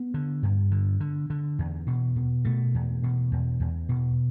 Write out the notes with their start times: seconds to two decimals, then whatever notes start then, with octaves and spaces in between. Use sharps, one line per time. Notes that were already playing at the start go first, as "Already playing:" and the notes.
Already playing: B3
0.14 D3
0.43 G2
0.71 D3
1.00 D3
1.30 D3
1.59 E2
1.87 B2
2.16 B2
2.45 B2 A3
2.74 E2
3.03 B2
3.32 E2
3.60 E2
3.89 B2